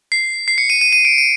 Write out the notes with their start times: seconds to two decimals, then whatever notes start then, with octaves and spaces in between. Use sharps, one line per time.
0.12 C7
0.48 C7
0.58 C#7
0.70 D#7
0.81 D#7
0.93 D#7
1.05 D7
1.18 D#7